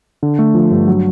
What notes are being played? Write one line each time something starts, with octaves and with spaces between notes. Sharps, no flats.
D3
A3
F3
G2
F#3